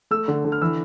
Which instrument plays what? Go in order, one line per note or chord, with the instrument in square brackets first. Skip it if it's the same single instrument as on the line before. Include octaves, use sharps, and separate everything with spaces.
[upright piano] A3 E6
D3
D3
F6
E3 E6